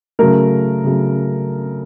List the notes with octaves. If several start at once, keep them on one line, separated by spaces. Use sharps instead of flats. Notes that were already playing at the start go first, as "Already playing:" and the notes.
C#3 F#3 A3 A#4
C#3 F#3 A3